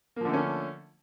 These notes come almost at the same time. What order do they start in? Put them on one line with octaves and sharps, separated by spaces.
A#3 F3 D3 A3 C#4